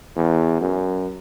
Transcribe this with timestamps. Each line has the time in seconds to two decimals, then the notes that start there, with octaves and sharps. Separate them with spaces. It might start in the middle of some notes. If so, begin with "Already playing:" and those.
0.16 E2
0.61 F#2